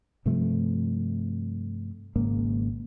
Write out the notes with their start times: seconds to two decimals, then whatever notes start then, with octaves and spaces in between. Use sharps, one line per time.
0.26 G2 C3 F3 A3
2.16 G#1 G#2 C#3 A#3